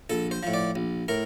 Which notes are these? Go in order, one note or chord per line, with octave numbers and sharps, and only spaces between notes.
A#1 A4
C5
A2 F3
D5
A#1
A2 A#4